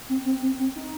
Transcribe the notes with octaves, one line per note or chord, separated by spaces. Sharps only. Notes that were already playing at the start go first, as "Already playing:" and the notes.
C4
C4
C4
C4
D#4